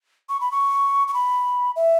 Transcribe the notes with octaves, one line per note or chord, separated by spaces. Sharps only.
C#6
B5
C#6
C#6
B5
E5